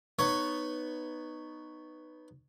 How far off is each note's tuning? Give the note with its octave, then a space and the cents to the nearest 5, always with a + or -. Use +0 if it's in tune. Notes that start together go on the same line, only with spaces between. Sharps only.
B3 +5 D#4 -15 C#5 +0